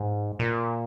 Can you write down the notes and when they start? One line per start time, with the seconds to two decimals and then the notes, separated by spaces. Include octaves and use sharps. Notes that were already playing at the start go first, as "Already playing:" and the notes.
Already playing: G#2
0.39 A#2